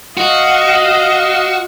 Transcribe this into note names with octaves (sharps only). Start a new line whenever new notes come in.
F#4 D#5 F5